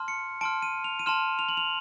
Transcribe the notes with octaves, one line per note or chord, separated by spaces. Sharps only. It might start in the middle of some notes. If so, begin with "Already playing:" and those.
Already playing: A5 C6 F6
C#7
A5 C6 F6 D7
D#7
F7
D#7
A5 C6 F6 E7
F7
F#7
F7